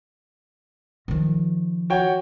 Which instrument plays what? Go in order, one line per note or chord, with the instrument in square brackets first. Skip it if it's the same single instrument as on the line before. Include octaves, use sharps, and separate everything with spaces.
[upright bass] D#3 F3
[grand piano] F#4 C#5 G5